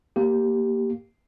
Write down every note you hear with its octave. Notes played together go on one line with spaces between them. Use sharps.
A#3 G4